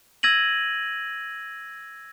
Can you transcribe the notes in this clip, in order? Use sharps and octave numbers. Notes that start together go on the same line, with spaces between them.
E6 G#6 A#6 D#7 F#7